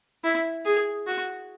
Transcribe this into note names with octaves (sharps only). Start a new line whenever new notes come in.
E4
G#4
F#4